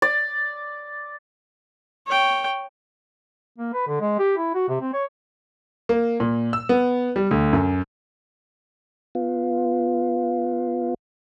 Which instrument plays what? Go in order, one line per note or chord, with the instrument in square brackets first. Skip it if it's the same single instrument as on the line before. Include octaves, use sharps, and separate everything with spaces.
[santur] D5
[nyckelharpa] C#5 G5
[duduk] A#3
B4
D3
G#3
G4
E4
F#4
C3
C4
C#5
[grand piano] A#3
A#2
E6
B3
G3
D2
F#2
[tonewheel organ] B3 F4